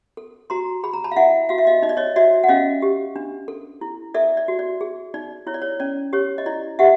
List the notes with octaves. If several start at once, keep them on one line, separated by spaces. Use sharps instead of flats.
A4
F#4 A#5 C6
G#4 B5
A#5
A5 B5
F5
E4 E5 F#5
F#4 F5
E5
D#5 F5
D#4 D#5
D5
C#5 D#5
F#4 D5 E5
F#5
C#4 D#5 F5
G4
D4
A4
E4
A4 D5 E5
D5
F#4
D5
G#4
D#4 D5
E4 C#5
D5
C#5
C#4 D5
G4 C#5
D#5
E4 D5
G4 E5 F#5